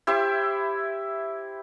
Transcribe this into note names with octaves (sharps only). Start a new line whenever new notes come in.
E4 G4 C5 E5